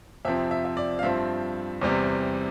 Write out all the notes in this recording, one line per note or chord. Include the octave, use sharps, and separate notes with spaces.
F2 C3 F3 C4 E5
E5
E5
D5
F5
G2 F3 C4 E5
E2 C3 G3 C4